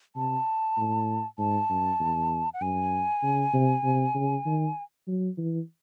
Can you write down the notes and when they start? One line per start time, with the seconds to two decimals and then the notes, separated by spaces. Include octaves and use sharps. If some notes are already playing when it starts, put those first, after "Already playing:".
0.16 C3 A5
0.77 A2
1.38 G#2 A5
1.70 F#2
2.00 E2
2.54 F#5
2.61 F#2 G#5
3.23 C#3
3.53 C3
3.84 C3
4.15 C#3
4.46 D#3
5.08 F#3
5.38 E3